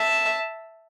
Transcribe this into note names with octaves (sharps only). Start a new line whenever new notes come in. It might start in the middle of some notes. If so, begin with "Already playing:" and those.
Already playing: E5 A5